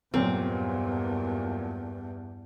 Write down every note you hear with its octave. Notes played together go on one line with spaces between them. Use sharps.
E2 G2 A#2 F#3 A#3 C4